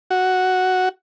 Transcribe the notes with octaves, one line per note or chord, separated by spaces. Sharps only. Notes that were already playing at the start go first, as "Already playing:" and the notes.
F#4